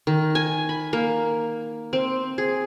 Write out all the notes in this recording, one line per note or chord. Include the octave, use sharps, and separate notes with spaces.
D#3
G#5
B5
A#3
C4
G#4